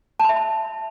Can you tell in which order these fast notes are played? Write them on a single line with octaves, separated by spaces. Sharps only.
A5 B5 E5